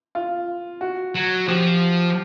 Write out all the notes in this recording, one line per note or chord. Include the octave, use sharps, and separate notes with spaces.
F4
F#4
F#3
F3 G4